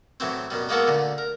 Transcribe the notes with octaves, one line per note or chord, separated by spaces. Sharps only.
A2 E3 F#3 C4
F#2 B2 G3
G#3 A#3 B3 F#4 A4 A#4
D2 A#2 D3
A#4